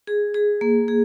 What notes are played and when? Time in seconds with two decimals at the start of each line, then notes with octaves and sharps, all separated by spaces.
0.07 G#4
0.34 G#4
0.61 A#3
0.88 G#4